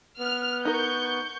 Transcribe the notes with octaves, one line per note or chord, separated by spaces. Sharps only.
B3 F6
D#4 A#4 C#6 G6